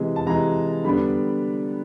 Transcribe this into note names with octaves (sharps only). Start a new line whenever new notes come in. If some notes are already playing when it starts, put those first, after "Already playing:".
Already playing: C3 E3 G#3
A5
C3 E3 G#3 A#5
D3 G3 B3 D4 B5